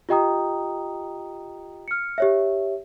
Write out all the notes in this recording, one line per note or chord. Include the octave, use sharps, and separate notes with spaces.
F4 G4 D#5 G5 A#5 D#6
F6 C#7
G4 C#5 E5